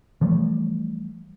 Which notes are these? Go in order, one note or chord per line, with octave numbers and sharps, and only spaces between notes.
E3 F3 G3 A3